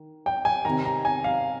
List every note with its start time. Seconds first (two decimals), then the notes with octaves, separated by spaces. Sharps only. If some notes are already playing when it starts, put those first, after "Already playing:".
Already playing: D#3
0.26 G5
0.45 G#5
0.65 C3 D#3 A#5
0.85 A#5
1.05 G#5
1.24 F5